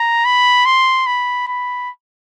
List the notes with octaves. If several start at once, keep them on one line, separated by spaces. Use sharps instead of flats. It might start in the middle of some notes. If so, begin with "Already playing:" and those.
Already playing: A#5
B5
C6
B5
B5